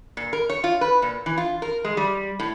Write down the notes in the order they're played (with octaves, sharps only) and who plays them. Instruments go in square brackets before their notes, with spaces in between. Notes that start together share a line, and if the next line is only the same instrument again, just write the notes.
[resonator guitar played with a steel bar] A#2
A#4
C#5
F4
B4
A#2
E3
F4
A#4
G#3
G3
A2